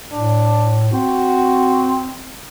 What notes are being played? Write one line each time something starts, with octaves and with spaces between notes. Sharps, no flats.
A2 D4
C4 F#4